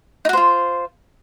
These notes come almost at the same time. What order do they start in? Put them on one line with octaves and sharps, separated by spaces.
D#4 F#4 C5 F4